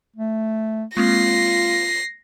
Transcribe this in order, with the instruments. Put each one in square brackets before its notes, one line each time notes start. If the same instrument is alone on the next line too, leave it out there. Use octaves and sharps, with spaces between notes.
[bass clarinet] A3
[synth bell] G#3 A#3 C4 [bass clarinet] F4 [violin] A#6 C7